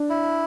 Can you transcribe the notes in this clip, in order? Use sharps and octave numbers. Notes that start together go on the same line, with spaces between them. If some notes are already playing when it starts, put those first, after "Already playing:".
Already playing: D4
E4